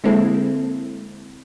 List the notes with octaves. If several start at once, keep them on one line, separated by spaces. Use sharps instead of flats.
D3 G#3 A#3 C4 E4 A4